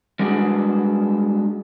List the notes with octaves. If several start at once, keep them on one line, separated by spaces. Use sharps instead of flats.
G3 G#3 B3 D4 F#4 G#4